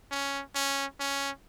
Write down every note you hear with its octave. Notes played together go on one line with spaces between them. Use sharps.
C#4
C#4
C#4